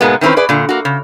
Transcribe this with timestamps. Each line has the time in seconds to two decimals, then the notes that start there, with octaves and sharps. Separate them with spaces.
0.01 G#2 B2 G#3 A#3 B3
0.21 D#3 E3 C4 C#4 B4
0.37 G#4 B4 D5
0.49 A#2 D3
0.69 A#3 F#4
0.85 C#3